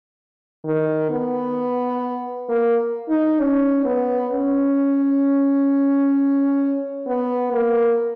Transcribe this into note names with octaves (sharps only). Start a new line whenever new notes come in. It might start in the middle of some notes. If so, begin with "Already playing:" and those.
D#3
B3
A#3
D#4
C#4
B3
C#4
B3
A#3